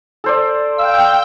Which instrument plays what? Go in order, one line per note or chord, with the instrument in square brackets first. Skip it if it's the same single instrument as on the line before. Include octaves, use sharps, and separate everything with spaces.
[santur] A4 C5 D5
[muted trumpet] F5 [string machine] G5 [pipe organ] E6